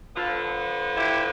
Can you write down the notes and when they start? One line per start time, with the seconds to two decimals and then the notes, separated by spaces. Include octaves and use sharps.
0.15 D3 F3 B3 F4 A4
0.96 E4 G4